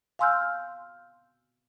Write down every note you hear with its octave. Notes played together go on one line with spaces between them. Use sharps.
F5 G#5 C6 E6 F6 G6